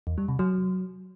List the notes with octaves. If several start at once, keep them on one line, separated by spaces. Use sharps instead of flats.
E2
G3
C3
F#3